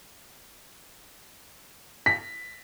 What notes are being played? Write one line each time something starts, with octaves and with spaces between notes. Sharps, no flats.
B6